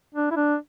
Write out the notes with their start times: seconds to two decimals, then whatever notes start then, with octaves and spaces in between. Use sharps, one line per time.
0.15 D4
0.31 E4
0.36 D4